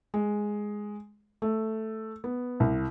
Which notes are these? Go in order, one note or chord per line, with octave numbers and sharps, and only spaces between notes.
G#3
A3
B3
C2